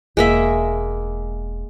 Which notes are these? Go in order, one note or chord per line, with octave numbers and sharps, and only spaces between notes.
E1 G#3 A#3 E5